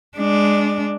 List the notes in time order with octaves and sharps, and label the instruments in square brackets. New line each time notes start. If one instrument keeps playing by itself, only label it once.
[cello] G#3 D4